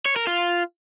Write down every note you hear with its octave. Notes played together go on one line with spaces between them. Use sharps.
C#5
A#4
F4